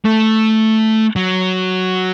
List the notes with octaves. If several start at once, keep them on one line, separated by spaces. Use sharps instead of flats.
A3
F#3